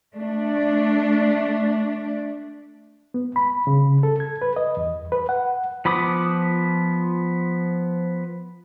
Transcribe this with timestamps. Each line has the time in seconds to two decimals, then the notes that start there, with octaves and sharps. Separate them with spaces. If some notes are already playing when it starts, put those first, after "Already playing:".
0.14 A3 D4
3.14 B3
3.36 B5
3.67 C#3
4.03 A4
4.20 G#6
4.42 B4
4.56 D#5
4.77 E2
5.12 B4
5.29 F#5
5.85 F3 B3 B5 D6 D#6